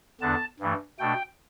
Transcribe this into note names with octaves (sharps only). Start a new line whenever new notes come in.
E2 D3 B3 D4 A5
G2 E3 A3
B2 A3 D4 G5